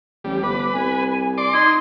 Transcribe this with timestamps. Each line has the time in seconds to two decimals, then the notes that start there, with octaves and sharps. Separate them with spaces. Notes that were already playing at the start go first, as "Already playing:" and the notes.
0.24 A1 G3
0.43 G1 B4 D6
0.73 C2 G#5
1.38 D5 C6 D6
1.54 D#4 C6 G#6